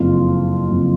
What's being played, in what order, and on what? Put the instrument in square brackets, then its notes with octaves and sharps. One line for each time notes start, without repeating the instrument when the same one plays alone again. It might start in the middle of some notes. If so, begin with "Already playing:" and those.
Already playing: [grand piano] F#1 F2 F3 F4
F#1 F2 F3